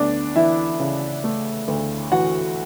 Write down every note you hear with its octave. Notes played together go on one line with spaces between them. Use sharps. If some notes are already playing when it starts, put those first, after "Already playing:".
Already playing: D2 A3 B3 D4 D5
E3 E4 E5
C#3
A3
D2
E3 F#4 F#5